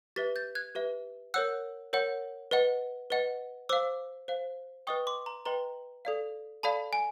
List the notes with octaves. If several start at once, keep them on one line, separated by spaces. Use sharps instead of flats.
G4 B4 E5 A6 B6
G6 A6
F#6 G#6
G4 B4 E5
A#4 C#5 F#5 E6 F#6
A#4 C#5 F#5
B4 D#5 F#5
B4 D#5 F#5
C5 F5 D6 E6
C5 F5
B4 D#5 G5 C#6 D#6
C6 D6
A#5 C6
B4 D#5 G5 A#5 C6
A4 D5 F5
A4 D5 F5 A5 B5
G#5